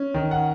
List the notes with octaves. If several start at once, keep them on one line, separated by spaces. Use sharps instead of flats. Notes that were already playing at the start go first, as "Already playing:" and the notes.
Already playing: C#4
D#3
F#5